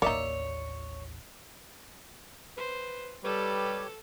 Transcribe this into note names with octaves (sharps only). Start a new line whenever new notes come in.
A1 D#2 A#3 D#4 C#5 D5 E5
B4 C5
G3 G4 A4 B4 C#5